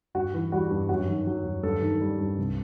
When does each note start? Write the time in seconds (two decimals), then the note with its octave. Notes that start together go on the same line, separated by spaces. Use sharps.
0.14 G2 F#4
0.34 E3
0.52 G3 F#4
0.71 G2
0.89 F#2 F#4
1.08 D#3
1.27 F#3
1.45 F#2
1.63 G2 A4
1.82 D#3
2.01 G3
2.19 G2
2.38 C2